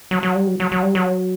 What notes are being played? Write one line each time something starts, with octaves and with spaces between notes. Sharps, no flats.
F#3
F#3
G3
F#3
F#3
F#3
G3
F#3